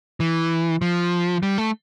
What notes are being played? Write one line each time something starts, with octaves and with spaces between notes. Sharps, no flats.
E3
F3
G3
A3